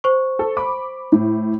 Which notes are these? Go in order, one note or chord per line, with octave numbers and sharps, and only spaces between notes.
C5 C#6
A4
B5 D6
A2